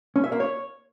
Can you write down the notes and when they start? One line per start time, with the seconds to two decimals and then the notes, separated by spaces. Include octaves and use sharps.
0.16 C#4
0.24 E5
0.32 A#3
0.40 C#5